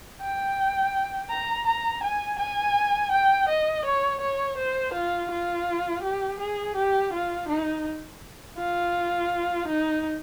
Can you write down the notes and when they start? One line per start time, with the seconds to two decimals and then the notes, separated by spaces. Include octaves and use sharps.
0.21 G5
1.29 A#5
1.67 A#5
2.03 G#5
2.39 G#5
3.11 G5
3.49 D#5
3.85 C#5
4.21 C#5
4.57 C5
4.94 F4
5.31 F4
6.03 G4
6.40 G#4
6.76 G4
7.13 F4
7.48 D#4
8.58 F4
9.68 D#4